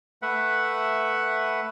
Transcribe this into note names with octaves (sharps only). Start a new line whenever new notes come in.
A3 B4 E5 F#5